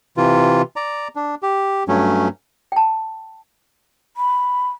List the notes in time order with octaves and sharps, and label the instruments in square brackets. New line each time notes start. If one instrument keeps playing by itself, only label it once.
[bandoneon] C3 E3 F4
D5 A#5
D4
G4
G2 F#3 A3 C#4
[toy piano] G5 A5
[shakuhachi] B5